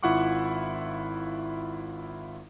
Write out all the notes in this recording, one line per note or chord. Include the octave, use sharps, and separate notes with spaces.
G#1 E4 F4 F#5 C#6 D6